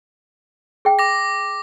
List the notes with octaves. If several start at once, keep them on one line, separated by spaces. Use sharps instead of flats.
G#4 G5
D6 A#6